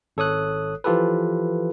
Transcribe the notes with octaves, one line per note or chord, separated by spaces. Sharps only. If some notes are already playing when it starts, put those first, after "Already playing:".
G#1 A4 C#5 D#6 F#6
E3 F3 F4 G4 A4 B4